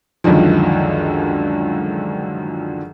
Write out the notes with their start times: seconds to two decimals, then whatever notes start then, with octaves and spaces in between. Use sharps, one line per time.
0.24 C#2 F#2 D3 D#3 F3